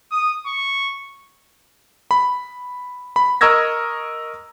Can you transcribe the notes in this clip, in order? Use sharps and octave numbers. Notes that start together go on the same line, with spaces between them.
D#6
C#6
B5
B5
A#4 D#5 C#6 E6 G#6 A#6